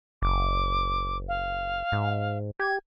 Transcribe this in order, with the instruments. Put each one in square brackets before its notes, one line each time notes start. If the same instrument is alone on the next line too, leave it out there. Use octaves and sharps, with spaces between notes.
[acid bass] F#1 [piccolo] D6
[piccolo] F5
[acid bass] G#2
[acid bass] G4 [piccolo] G#6